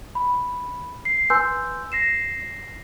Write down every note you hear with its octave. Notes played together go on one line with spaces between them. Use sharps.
B5
C7
B4 G#5 C6 E6 G6
A#6 C7 E7